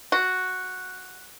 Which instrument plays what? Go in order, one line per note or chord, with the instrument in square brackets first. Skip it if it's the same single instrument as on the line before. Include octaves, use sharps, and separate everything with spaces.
[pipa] F#4